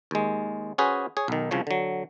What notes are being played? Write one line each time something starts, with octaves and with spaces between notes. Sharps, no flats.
D#2 G#3
C#4 F#4 G#4 B4 C5
G#4 C#5
B1 D#3
C2 C#3 F3 C#5
D3 F#3